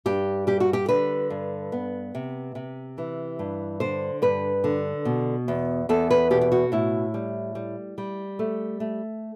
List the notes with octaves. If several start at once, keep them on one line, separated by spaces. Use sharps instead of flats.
G2 G4
G3 G4
F#4
G4
D3 B4
G2
B3
C3
C3
E3
G2
D3 C5
G2 B4
D3
B2
E2
E2 A4
B4
B2 G4
G4
F#4
A2 E4
G3
G3
G3
A3
A3